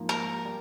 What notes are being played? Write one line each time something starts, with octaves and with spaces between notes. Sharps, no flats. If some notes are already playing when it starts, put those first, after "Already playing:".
Already playing: G#2 F3 A#3
A#4
G3